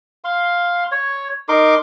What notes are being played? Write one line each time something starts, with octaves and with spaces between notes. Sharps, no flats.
F5 C6
C#5
D#4 A#4 C6 D6